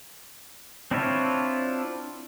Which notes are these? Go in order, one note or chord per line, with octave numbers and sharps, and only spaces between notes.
C4 D4 E4 F4 C#5